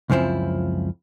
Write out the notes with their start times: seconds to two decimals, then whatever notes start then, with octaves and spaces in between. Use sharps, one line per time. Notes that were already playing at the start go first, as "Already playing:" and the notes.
0.10 C#2 F#2 C#3 F3 C4 E4